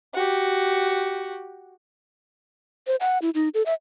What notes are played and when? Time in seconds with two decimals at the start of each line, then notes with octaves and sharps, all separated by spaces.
0.14 F#4 G4
2.87 C5
3.00 F#5
3.22 E4
3.35 D#4
3.54 A4
3.66 E5